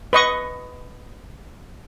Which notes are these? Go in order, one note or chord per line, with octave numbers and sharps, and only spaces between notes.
B4 D#5 C#6